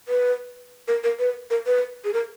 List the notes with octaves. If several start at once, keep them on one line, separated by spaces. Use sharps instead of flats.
B4
A#4
A#4
B4
A#4
B4
G#4
A#4